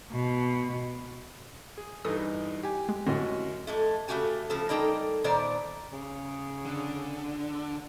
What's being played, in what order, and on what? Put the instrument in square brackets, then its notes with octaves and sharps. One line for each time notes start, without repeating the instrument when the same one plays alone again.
[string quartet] B2
[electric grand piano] G#4
[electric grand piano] G2 E3 D#4 [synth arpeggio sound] A4 D#6
[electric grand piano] G4 G#5
[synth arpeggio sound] G#3
[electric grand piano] F#2 F#4 D#5 [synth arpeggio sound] A2 D3 C4
[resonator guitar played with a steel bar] F2 G#3 A3
C#3 F#3 A3 F#4 G4 G#5
C#3 F3 A4 A5
G3 A#3 D#4 A4 G5
A#2 D#3 B3 C5 D5
[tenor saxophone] C#3
[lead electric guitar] D3